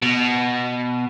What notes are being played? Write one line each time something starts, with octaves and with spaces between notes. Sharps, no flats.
B2